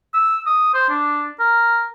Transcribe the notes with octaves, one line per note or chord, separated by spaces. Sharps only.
E6
D#6
C5
D4
A#4